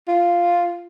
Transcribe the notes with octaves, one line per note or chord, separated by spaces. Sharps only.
F4